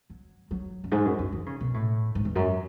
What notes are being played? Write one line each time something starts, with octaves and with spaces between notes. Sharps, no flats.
F#3
F#3
F#2
G#2
F#2
F#2
E3
C#3
B2
A2
G#2
E2
F#2